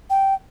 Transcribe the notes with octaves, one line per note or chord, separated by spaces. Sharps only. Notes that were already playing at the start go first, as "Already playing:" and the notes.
G5